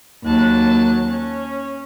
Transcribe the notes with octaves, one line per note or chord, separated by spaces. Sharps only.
D#2 F#3 A5 F#6
C#4